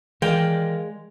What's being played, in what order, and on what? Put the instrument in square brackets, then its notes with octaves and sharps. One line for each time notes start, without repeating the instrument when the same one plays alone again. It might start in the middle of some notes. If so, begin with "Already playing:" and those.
[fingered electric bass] D#3 E3 [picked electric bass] G#3 [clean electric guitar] A#4 D5 F5 [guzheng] G5